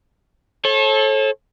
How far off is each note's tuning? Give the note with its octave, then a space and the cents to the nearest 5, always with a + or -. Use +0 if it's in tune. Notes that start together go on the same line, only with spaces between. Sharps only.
A4 -20 C#5 -40